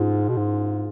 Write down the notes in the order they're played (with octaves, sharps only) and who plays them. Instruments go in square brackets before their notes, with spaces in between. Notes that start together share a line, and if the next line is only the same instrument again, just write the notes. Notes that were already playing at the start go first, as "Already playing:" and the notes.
Already playing: [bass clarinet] G#2 [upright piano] F4 G#4
[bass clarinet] B2
G#2